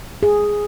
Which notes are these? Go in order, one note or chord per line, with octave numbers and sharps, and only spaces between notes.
G#4